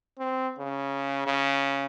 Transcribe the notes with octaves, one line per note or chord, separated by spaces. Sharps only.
C4
C#3
C#3